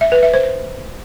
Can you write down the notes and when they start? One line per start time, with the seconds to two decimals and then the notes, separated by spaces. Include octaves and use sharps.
0.01 E5
0.12 B4
0.23 E5
0.34 C5